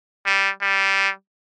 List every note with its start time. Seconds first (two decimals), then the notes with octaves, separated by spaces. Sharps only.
0.26 G3
0.62 G3